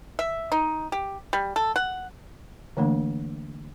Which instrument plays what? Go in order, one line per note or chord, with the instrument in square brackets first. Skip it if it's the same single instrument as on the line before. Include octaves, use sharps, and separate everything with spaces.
[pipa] E5
D#4
G4
G3
A4
F#5
[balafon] D3 E3 A3 A#3 D4